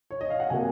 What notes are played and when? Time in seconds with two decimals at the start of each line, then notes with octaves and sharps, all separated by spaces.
0.11 C#5
0.21 D#5
0.30 F5
0.40 F#5
0.50 C3 F#3 A#3 G#5